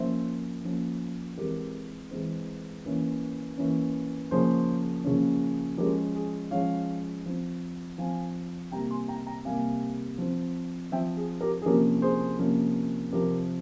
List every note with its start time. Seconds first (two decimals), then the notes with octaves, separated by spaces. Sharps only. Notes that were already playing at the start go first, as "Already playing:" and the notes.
Already playing: F3 A#3 C#4 C5 E5
0.64 F3 A#3 C#4
1.37 E3 G#3 C4 G4 A#4
2.11 E3 G#3 C4
2.85 E3 A#3 C#4
3.58 E3 A#3 C#4
4.31 C#3 F3 A#3 C#4 G#4 C5
5.04 C#3 F3 A#3 C#4
5.78 F3 G#3 C#4 G4 A#4
6.15 G#4
6.51 F3 G#3 C#4 C#5 F5
7.26 F3 C4
7.98 F3 C4 F5 G#5
8.71 C3 G3 A#3 G5 A#5
8.90 G#5 C6
9.08 G5 A#5
9.26 G5 A#5
9.45 C3 G3 A#3 F5 G#5
10.18 F3 C4
10.92 F3 C4 E5 G5
11.17 G#4
11.41 G4 A#4
11.62 G#4
11.65 C3 F3 A#3 C#4 G4 A#4
12.02 G#4 C5
12.39 C3 F3 A#3 C#4
13.12 C3 F3 C4 G4 A#4